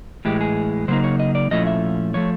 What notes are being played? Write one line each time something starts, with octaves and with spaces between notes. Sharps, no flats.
A2 E3 G#3 G4
G#4
C#3 F#3 A#3 D#4 C5
C#5
D#5
D5
A#2 F3 A3 C#4 E4 D#5
E5
F3 A3 C#5